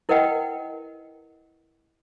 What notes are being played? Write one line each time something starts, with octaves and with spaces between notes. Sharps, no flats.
E4 A#4 B4 D#5 F#5 G5